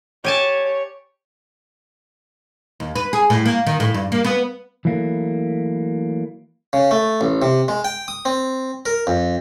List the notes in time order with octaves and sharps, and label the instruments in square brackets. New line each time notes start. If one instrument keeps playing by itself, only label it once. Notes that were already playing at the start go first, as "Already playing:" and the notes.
[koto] G4 G#5 A5 [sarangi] C#5
[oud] D#2
B4
G#4
A2
A#3
D#3
A2
G2
A#3
B3
[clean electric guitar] E3 F#3 A3 A#3
[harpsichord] C#3
A3
A1
C3
G#3
G5
D#6
C4
A#4
F2